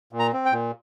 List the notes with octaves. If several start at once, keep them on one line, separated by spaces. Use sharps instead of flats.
A#2
A#5
C4
G5
A#2